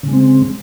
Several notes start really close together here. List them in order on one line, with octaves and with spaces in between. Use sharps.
C#3 G#3 C4